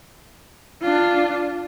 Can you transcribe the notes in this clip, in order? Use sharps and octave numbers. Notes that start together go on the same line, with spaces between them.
D4 F4